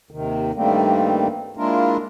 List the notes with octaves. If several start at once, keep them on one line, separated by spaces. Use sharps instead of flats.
D#2 C3 D#3
G2 D#3 G3 A3 A#3 C4
G#3 A#3 D4 E4 F4 A#4